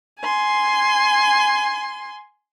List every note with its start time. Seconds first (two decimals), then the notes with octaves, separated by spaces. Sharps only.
0.20 G#5 C6